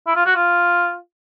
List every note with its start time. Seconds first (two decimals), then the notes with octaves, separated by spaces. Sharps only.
0.07 E4
0.16 F4
0.26 F#4
0.35 F4